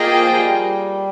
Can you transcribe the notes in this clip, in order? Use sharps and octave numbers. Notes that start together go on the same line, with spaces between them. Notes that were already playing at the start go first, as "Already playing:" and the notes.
Already playing: A#3 F4 G#4 D#5 G5
F3
G3